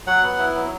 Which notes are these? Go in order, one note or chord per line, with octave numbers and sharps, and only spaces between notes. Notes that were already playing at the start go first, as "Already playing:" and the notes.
F#3 F#5
B3
E4
F#3